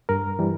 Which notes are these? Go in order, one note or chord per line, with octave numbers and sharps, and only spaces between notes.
G2 A#4
E3 G3